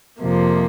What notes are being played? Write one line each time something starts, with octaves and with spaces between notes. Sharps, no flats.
F2 C3 F3 A#3